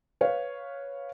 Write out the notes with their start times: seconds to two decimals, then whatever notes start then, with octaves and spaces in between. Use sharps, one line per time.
0.21 B4 C#5 F5